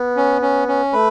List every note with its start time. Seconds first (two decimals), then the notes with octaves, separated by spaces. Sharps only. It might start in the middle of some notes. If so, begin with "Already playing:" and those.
Already playing: B3
0.17 C#4
0.42 C#4
0.68 C#4
0.93 A3 B4